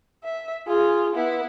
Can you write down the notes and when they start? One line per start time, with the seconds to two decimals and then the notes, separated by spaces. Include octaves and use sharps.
0.23 E5
0.67 F4 G#4
1.15 B3 E4